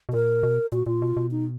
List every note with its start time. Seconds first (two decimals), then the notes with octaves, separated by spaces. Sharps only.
0.09 B2
0.13 A#2 A#4
0.43 B2
0.72 A#2 F#4
0.86 A#2 F4
1.02 B2
1.17 B2
1.31 D#4